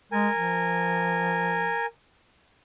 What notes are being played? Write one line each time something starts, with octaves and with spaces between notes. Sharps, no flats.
G#3 A#4 G#5
F3